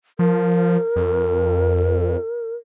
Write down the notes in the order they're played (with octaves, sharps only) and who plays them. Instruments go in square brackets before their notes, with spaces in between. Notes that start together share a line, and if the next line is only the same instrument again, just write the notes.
[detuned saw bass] F3 [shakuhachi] A#4
[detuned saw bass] F2